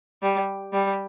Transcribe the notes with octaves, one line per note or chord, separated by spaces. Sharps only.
G3
G3